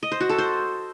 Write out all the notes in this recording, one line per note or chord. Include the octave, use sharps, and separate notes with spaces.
D#5
C5
F#4
A4
C5